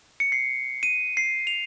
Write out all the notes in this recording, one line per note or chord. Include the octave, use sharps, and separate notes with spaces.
C#7
C7
D#7
C7
F7